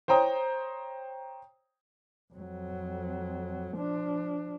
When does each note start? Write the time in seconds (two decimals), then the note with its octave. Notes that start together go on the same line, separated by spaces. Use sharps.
0.08 C5 C#5 G5 A#5 D#6
2.34 F2 F#3
3.76 F3 D4